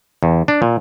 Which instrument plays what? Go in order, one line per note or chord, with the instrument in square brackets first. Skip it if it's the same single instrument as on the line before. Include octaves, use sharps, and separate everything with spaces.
[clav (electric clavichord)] E2
D4
A#2